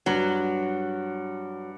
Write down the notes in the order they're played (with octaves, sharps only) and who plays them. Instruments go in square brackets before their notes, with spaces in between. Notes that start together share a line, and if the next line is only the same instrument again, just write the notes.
[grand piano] G2 [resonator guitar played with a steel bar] F#3